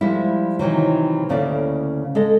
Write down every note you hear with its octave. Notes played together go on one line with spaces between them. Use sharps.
F3 G3 G#3 E4
C3 D#3 E3 F#3
D2 C#3 A#3 E4 D5
G#3 A4 D#5